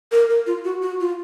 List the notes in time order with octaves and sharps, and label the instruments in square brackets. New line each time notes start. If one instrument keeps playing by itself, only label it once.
[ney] A#4
A#4
F4
F#4
F#4
F4